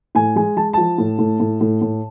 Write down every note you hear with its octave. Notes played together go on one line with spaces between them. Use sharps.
A2 G#5
G#3 G#5
G#3 A5
F3 A5
A2
A2
A2
A2
A2